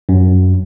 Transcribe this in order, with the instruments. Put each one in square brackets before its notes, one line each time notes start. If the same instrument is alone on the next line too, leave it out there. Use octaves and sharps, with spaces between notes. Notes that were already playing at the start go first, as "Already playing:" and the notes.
[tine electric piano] F#2